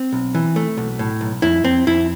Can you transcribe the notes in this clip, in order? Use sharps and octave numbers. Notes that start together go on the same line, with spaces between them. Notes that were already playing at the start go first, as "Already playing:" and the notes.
Already playing: C4
B1
E3
A3
B1
A2
B1
F2 E4
F2 C4
F2 E4